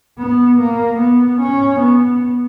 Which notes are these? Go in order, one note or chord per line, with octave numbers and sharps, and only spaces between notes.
B3
A#3
B3
C#4
B3